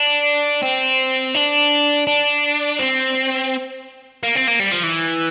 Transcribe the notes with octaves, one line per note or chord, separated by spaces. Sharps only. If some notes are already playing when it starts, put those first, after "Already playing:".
Already playing: D4
C4
D4
D4
C4
A#3
C4
A#3
G3
F3
E3